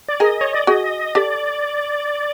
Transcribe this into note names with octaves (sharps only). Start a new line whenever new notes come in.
D5
G#4 A#4 D#5
C#5
D5
F#4 G#4 D#5
G4 A4 D5